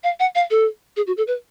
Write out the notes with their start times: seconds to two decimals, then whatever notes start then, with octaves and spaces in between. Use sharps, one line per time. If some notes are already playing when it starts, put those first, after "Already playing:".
0.04 F5
0.20 F#5
0.35 F5
0.51 A4
0.97 G#4
1.07 F#4
1.17 A4
1.28 B4